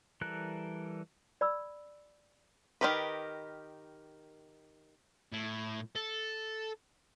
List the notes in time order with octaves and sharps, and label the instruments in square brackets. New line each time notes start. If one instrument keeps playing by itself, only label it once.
[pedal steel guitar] E3 G3 A4 A#4 F#6
[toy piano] D5 B5 E6
[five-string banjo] D#3 F#3 G4 A#4 B4
[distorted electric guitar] A2
A4